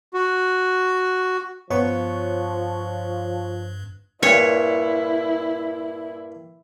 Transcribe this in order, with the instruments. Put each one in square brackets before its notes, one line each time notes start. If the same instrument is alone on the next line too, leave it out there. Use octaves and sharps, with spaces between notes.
[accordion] F#4
[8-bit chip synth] G2 [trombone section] F3 [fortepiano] B3 [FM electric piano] C#5 C#6
[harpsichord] G2 A#2 [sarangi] E4 [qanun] C#5